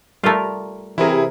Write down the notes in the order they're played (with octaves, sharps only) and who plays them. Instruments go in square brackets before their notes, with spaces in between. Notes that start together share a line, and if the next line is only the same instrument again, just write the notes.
[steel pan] G3 A#4 [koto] A3 F4
[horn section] C3 [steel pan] E3 A#4 [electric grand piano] E4 G#4